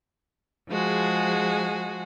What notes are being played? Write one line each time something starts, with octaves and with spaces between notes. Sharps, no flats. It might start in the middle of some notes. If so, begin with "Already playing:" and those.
F3 G#3 F#4 G#4